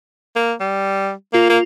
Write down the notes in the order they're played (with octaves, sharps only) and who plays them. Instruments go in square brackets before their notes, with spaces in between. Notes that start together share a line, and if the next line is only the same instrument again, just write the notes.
[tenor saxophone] A#3
G3
[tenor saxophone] A#3 [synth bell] F4
[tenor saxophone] A#3